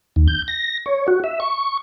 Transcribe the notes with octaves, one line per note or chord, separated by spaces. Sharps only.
D#2
G6
A#6
C#5
F#4
E5
C#6